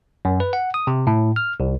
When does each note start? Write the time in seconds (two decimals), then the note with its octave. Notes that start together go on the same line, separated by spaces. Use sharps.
0.25 F#2
0.40 B4
0.53 F#5
0.74 D#6
0.87 C3
1.07 A2
1.36 F6
1.60 C2